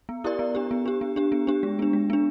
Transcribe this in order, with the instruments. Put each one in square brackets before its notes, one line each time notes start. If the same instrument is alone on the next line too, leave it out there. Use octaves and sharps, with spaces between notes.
[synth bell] B3
E4 G4 A#4 D5
B3
D4 G4
B3
D4 G4
B3
D4 G4
B3
D4 G4
G#3
B3 D4
G#3
B3 D4